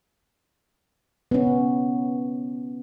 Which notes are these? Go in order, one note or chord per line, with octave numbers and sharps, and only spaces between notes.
B3 C#4